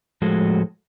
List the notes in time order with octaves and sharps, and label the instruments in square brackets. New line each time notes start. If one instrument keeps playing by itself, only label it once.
[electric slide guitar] A2 F3 G#3 F#4 G#4 A4